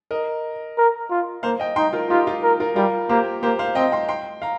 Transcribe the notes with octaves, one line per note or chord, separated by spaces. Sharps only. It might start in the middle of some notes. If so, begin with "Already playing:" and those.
A#4 D#5
A#4
F4
A#3 C5 F5
D#5 G5
D#4 G5 C6
F4 A#4
D#4 F4 G4
F4
A#4
F4 A#4
G3 F4 A#4
A#3 G4 C5
A#3 G4 C5
C5 F5
C4 D#5 G5
G5 C6
G5 C6
F5 A#5